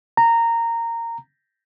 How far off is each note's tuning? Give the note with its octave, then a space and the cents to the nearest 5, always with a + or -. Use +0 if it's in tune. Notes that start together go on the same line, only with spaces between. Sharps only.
A#5 -15